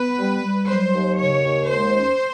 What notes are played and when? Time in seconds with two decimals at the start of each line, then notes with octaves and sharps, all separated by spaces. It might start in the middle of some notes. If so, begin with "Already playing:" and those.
Already playing: B3 B4
0.19 G3
0.44 G3
0.68 F#3 C5
0.94 D#2
1.18 C#3 C#5
1.44 D#2
1.69 G#3 C5
1.94 C#4